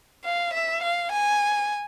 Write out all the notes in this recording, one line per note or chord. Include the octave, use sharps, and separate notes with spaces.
F5
E5
F5
G#5